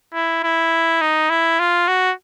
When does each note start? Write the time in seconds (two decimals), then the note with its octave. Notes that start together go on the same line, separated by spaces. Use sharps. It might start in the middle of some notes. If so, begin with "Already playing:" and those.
0.14 E4
0.43 E4
1.01 D#4
1.30 E4
1.60 F4
1.88 F#4